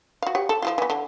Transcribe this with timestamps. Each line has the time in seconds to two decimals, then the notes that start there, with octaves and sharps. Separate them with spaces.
0.22 F#4 F5
0.35 G4 C#5 F#5
0.49 A4
0.62 F3 E4 F4
0.78 E3 B3
0.90 D3